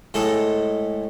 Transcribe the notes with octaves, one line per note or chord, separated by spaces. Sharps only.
A2 G#3 A4